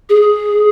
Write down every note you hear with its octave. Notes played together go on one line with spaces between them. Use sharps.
G#4